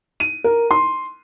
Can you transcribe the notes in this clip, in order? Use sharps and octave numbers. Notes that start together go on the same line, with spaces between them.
D#7
A#4
C6